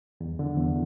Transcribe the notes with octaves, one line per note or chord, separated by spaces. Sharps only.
E2
D3
E2